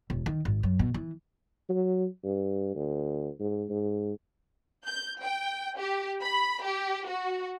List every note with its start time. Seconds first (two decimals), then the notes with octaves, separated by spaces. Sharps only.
0.10 E1
0.26 D#3
0.45 G#1
0.63 F#2
0.79 B2
0.94 E3
1.69 F#3
2.24 G2
2.75 D2
3.40 G#2
3.70 G#2
4.86 G6
5.23 G5
5.78 G4
6.23 B5
6.63 G4
7.07 F#4